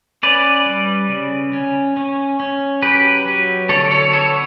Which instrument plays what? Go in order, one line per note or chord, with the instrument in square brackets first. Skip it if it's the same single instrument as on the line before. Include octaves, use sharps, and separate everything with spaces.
[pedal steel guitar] C#4 B4 D5
G3
C#3
C#4
C#4
C#4
F#3 G4 B4
F#3
D3 A4 C#5
A4 C#5
B3 A4 C#5